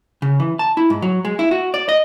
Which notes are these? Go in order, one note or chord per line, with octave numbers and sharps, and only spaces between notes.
C#3
E3
A5
E4
G#2
F#3
G#3
E4
F#4
D5
D#5